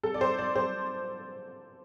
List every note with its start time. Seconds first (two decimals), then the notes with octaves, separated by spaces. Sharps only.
0.03 A4
0.14 D5
0.21 C5
0.38 D5
0.55 C5